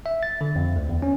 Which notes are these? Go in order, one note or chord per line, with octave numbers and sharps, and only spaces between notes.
E5
A6
D3
F2
D2
E2
C#4